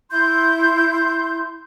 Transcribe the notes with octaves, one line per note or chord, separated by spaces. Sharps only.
E4 C6 G6